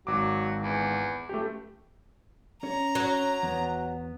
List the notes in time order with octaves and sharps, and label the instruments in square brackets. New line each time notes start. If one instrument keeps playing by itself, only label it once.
[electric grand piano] G#1 D6 [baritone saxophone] F#3
[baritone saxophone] E2
[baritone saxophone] C#2 [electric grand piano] A3 G4
[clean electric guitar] C#4 C#5 [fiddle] A#5
[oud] F#3
[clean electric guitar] E2 B3